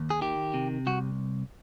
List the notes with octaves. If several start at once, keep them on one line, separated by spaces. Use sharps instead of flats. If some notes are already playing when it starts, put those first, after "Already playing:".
Already playing: D#2
G#4
D#3 G4
C3
C2 F#4